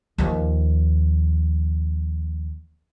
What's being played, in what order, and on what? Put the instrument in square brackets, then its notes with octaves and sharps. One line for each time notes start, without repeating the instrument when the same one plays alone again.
[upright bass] D#2 F3